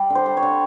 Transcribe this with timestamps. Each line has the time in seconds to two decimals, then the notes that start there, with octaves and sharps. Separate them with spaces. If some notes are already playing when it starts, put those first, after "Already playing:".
Already playing: G3 D5
0.10 D3
0.15 C5
0.26 G3
0.37 C#5
0.43 D3